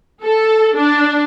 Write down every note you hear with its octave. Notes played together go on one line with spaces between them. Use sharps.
A4
D4